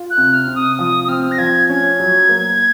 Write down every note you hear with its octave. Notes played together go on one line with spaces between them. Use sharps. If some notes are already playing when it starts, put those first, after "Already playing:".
Already playing: F4
F#6
C3
F6
C3
D#6
F3 D#6
D#6
C4 F6
A#6
F3 G#6
C#4 G#6
F#3
A#3